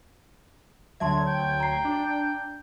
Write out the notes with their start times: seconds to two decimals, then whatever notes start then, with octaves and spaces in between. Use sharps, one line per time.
1.00 D2 F#3 E5 A5 C6 G#6
1.28 G5
1.60 A#5 C7
1.85 D4